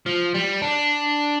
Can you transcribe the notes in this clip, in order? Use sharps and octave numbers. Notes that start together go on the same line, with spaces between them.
F3
G3
D4